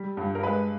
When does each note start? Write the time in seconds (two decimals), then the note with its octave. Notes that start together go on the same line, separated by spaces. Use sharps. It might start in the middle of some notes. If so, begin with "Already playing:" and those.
Already playing: G3
0.17 G2
0.35 A#4
0.43 G#3 B4